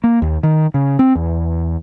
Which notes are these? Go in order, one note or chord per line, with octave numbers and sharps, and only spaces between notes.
A#3
D#2
D#3
C#3
C4
E2